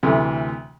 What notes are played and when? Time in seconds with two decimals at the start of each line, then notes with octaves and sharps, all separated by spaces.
0.03 D2 C3 E3 A3